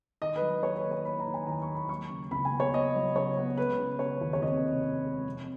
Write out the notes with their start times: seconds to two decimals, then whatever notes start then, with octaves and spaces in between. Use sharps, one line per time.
0.22 D#3 D#5
0.36 B4
0.42 F#3
0.49 D#5
0.63 A#3 C#5
0.77 B4
0.84 D#3
0.91 C#5
1.05 A#3 B5
1.20 A#5
1.26 D#3
1.34 G#5
1.47 D#2 A#5
1.62 C#6
1.69 A#3
1.75 B5
1.89 F#3 C#6
2.10 C#3
2.31 C#2 B5
2.45 G#5
2.52 B3
2.60 C#5
2.74 B3 D#5
2.95 F#3
3.16 C#3 C#5
3.37 B3
3.57 G#3 B4
3.79 C#3
3.99 C#3 C#5
4.21 D#2
4.33 C#5
4.41 F1 D#5
4.63 C#3
4.84 C#3
5.04 G#3
5.26 F2